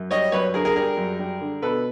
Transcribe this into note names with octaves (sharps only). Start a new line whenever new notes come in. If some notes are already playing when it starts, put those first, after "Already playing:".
Already playing: F#2
G3 C#5 D#5
F#2 B4 C#5
D3 G#4 A#4
G#4 A#4
G3 G#4 A#4
F#2
G3
D3
B2 A4 B4